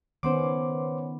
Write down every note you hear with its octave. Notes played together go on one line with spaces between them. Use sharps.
D#3 B3 C#4 C5 C#5 F#5 C6 D6